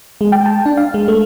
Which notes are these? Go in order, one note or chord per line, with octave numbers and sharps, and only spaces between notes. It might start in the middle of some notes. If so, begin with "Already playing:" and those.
G#3
G5
A5
D4
F5
G#3
A3